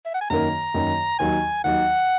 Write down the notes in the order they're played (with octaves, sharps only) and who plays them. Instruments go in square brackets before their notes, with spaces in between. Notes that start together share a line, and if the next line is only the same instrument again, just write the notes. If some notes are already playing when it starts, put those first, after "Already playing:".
[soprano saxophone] E5
F#5
G#5
[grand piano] F#2 D#3 A#3 [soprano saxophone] A#5
[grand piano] F#2 D#3 A#3
[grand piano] D#2 D#3 F#3 [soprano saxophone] G#5
[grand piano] D#2 D#3 F#3 [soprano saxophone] F#5